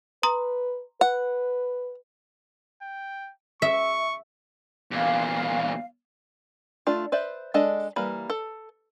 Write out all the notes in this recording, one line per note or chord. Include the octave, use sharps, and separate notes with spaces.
B4 A#5 C6 D#6
B4 F#5
G5
E5 C#6
E2 A#2 F5
A3 D4 F4
B4 C5 D5 E5
G#3 D4 A4 D#5 A5
E3 G3 A#3 B4 B5
A4